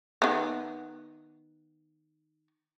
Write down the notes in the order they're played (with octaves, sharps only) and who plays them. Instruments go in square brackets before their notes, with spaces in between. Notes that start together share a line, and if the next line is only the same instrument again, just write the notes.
[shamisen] D#3 B3